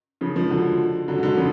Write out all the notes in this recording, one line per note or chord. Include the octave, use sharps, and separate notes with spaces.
C#3 F3
F3 G#3
D3 F#3
D3 F#3
G#3
D3 F#3
C#3 F3